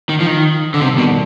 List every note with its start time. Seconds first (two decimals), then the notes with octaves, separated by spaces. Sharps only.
0.09 D#3
0.20 F3
0.27 D#3
0.74 D3
0.81 F2 C3 D#3 G3 B3 D4
0.98 B2